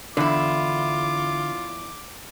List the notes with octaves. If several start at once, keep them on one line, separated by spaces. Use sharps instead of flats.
E2 D3 E4 F4 D6